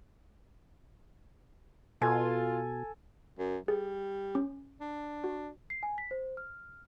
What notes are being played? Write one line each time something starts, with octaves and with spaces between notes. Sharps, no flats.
B2 F4 A4 G#5
F#2
G3 G#4
C#4
D4
F#4
C7
G#5
B6
C5
F6